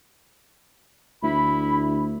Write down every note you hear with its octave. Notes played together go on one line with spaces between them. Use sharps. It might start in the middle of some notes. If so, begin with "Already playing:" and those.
D2 E4 B5